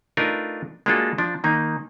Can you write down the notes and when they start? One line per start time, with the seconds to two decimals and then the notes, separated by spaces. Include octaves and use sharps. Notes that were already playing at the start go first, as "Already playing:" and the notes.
0.17 A3 D4 D#4 F4 A#4 B4
0.86 G#3 A#3 D4 F4 F#4 A4
1.18 F3 D4
1.44 D#3 A#3 D#4